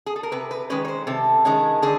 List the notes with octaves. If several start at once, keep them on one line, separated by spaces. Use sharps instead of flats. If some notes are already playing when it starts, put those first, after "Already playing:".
G#4
A4
A#4
C3 B4
B4
D#3 G#3 C#4 B4
C#5
C5
C3 A4
D#3 G#3 C#4
D3 G#4